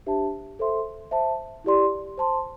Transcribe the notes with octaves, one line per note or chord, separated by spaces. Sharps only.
D4 G4 C5 E5 A5
A4 C5 E5 C6
C5 E5 A5
E4 G4 D5 C6
C5 A5 C6